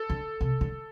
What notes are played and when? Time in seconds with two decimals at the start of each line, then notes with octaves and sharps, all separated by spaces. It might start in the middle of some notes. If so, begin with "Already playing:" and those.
Already playing: A4
0.10 D3
0.41 C3
0.61 D3